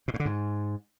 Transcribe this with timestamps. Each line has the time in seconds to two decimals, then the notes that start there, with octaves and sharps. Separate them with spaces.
0.08 B2
0.14 A2
0.20 D3
0.26 G#2